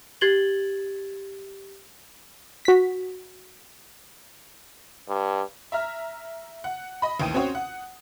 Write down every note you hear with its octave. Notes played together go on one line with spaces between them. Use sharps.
G4 G#6 A6 F#7 G7
F#4 B6
G2
E5 A#5 F6
F#5
D#5 B5
A1 D#2 G5 D#6 D#7
C4 C#4 F#4 C5 C#5
F#5